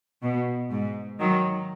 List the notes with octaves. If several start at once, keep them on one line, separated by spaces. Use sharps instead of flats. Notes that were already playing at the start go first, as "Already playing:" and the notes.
B2
G#2
D#3 F#3